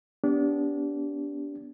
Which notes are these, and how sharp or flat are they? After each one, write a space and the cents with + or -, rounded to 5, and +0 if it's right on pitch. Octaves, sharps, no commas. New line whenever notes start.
B3 +0 D4 -30 G4 +0